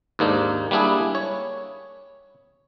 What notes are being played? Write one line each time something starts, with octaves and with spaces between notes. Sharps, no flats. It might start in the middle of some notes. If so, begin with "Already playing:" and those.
D#2 G#2 A#3 D4
G3 A#3 D4 E4 G#4
C#5